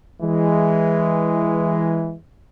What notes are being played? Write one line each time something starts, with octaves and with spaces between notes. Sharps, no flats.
E3 G#3